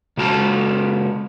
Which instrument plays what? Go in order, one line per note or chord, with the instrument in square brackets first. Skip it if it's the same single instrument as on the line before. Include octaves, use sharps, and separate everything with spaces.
[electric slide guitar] C#3 G#3 F#4 A5